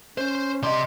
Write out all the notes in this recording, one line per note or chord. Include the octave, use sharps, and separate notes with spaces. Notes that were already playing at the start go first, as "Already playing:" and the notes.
C#4 C5
C3 D5 D#5 C6